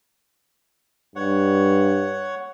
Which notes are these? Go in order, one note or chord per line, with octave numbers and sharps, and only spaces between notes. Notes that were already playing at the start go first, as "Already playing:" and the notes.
G2 C#5 F#5